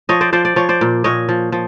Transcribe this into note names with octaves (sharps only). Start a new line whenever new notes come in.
F3 C#5 D#5
C5 D5
F3 C5 D5
D5
F3 C#5
C5 D5
A#2
A#2 C#5 D#5
F3
F3